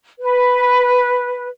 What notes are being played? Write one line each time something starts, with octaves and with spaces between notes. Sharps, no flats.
B4